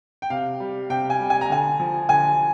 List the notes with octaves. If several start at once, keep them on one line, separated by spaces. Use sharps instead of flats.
G5
C3 F5
G3
C3 G5
G#5
G3
G#5
A#5
D3 G#5
F3
D3 G#5